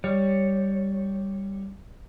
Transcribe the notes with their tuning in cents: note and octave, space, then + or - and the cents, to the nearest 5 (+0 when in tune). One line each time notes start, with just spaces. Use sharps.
G3 +0 C#5 +0